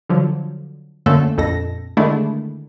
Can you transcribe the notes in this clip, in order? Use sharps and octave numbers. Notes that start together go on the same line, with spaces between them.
D3 F3 F#3
F#2 D3 A3 A#3 C#4 A4
A#1 F2 A4 A#6
D3 D#3 G#3 A3 D4 E4